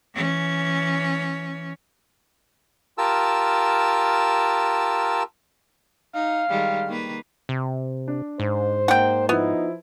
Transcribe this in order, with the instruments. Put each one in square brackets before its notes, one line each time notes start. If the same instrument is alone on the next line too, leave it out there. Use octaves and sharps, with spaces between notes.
[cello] E3 C#4
[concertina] F4 G4 A#4 A5 E6
[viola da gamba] D#4 [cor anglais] F5
[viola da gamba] D#3 G3 G#3
D#3 A#3 B4
[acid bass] C3
[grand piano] D4
[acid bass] G#2 [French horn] C5
[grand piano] A#3 D#4 [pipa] F#5 G5
[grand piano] F3 E4 [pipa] B3 [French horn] D#4